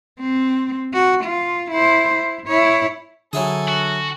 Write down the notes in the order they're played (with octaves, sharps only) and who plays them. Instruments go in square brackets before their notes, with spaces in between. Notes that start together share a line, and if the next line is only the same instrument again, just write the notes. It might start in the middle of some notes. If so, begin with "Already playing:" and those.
[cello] C4
F#4
F4
E4 C5
E4
E4 C#5
[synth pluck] D3 [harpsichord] F#3 E4 G#4 [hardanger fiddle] A4 G#5
[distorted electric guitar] F#4